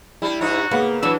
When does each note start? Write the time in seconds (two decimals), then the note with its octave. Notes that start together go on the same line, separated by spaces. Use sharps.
0.22 G3 D4 E4
0.41 G2 C#4 D#4 F#4
0.71 C#3 A#3 B3
1.03 E3 F#3 D4 E6